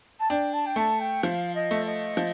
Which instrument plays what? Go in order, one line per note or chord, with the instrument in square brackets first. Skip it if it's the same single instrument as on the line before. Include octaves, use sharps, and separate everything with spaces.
[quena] A5
[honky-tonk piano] D4 [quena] G5
[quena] A5
G5
[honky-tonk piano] A3 [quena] A5
[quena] G5
[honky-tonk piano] F3 [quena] F5
[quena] D#5
[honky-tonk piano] A3
[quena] D#5
[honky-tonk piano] F3